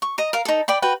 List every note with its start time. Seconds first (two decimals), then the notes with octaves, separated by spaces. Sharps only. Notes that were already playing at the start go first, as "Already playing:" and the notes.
0.02 C#6
0.18 D#5 A#5
0.33 A#4 F5
0.45 D#4 A4
0.68 D5 G5 B5
0.82 F#4 B4 G5